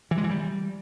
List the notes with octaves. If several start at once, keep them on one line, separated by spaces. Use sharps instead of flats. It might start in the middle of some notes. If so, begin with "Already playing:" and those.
E3
G#3
E3
G3